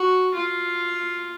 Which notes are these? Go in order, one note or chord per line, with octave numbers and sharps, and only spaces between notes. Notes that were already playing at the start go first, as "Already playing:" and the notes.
Already playing: F#4
F4